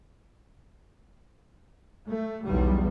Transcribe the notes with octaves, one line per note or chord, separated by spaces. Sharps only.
A3
B1 E2 G3